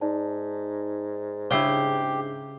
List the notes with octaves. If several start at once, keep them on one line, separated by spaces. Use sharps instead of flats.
G#2 D#4 D5 A5
C#3 D4 E4 G4 C7 G7